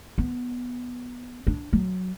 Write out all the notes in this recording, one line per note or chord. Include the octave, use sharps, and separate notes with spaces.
B3
D4
F#3